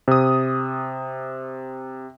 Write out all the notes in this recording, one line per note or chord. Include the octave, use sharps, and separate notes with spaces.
C3 D#6